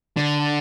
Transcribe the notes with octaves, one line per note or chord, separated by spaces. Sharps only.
D3